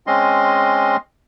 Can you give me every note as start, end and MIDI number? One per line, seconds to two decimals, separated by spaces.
0.07 0.97 56
0.07 0.97 60
0.07 0.97 61
0.07 0.97 75
0.07 0.97 84